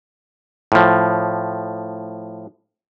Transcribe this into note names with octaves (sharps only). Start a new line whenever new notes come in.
A2 F3